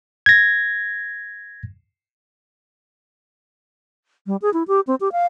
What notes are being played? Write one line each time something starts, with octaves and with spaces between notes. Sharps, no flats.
G#6 A#6
G3
G#4
E4
G4
C4
G4
F5